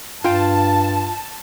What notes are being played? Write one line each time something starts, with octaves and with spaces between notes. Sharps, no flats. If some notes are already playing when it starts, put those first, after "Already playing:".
G2 F4 G5 A5